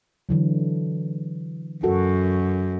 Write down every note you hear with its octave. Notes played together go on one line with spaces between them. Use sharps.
D3 E3 F#3
F#2 F#4 A4 A#4